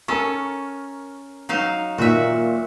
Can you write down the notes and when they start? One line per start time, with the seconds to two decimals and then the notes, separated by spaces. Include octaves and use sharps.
0.08 C#4 A4 A#4 C#6
1.49 F#3 D#4 F5
1.98 A#2 D#3 F#4 E5